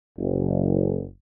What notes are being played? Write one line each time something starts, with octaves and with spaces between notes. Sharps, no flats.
F#1